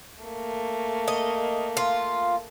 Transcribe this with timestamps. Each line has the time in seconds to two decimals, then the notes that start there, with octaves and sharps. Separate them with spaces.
0.23 A3 A#3
1.08 D#5
1.77 F4